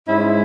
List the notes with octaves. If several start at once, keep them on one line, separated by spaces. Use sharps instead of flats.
G#2 G#3 C#4 E4